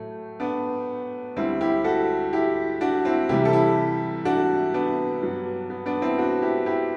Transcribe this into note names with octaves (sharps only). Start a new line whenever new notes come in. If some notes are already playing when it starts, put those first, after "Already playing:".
Already playing: A2 F#3 A3
B3 D4
D2 D3 G3 C4 E4
E4 G4
F#4 A4
E4 G4
D4 F#4
C4 E4
C2 C3 E3 G3 E4 G4
A4
E4 G4
D4 F#4
B3 D4
G2 F#3
B3
B3 D4
C4 E4
D4 F#4
E4 G4
E4 G4